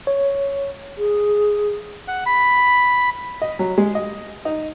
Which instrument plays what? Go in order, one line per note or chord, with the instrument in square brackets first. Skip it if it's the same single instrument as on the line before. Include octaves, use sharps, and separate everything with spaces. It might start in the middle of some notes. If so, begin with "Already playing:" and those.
[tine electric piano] C#5
[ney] G#4
[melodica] F#5
B5
[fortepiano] D#5
F#3
G#3
D#5
D#4